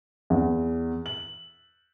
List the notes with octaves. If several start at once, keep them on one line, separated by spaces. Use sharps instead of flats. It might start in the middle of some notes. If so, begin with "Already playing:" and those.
E2
F#7